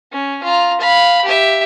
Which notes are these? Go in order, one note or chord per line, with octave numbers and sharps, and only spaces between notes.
C#4
F4 A#5
F5 B5
G4 E5